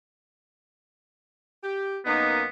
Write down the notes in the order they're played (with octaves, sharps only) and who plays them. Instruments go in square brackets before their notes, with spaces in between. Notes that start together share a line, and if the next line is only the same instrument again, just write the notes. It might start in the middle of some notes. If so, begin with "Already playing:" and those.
[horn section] G4
[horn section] F#2 A#3 D#4 [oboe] B3